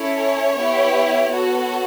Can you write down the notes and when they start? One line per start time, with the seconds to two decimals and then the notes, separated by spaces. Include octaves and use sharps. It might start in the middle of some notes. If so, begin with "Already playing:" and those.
Already playing: C#4 E4 A4 C#5
0.57 B3 E4 G4
1.31 B3 F#4 A4